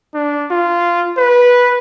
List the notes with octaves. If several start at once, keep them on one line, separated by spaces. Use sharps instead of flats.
D4
F4
B4